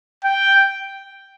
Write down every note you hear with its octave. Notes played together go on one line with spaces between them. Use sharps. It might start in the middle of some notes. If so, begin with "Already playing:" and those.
G5